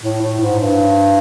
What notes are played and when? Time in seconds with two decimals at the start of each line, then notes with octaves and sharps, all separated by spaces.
0.02 A2
0.22 A2
0.41 G#2
0.60 G2